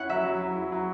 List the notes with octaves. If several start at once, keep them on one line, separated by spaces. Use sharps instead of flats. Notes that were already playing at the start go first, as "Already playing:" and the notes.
Already playing: C#4 E4 F#5
F#3 E5
F#3
F#3
E4
F#3